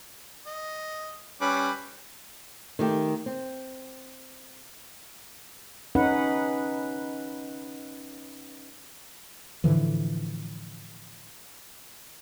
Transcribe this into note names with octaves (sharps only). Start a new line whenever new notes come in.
D#5
G3 C#4 B4 D6
D#3 A3 G4
C4
C#4 D#4 B4 F#5
A2 D3 E3 F3